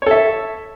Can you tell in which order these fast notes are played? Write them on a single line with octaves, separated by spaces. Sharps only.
C#5 A4 E5